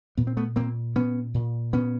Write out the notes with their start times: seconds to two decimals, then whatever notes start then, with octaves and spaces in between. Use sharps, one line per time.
0.17 A#2 B3
0.27 C4
0.37 A3 B3
0.56 A#2 A#3 C4
0.95 A#2 B3 C#4
1.34 A#2
1.73 A#2 B3 C#4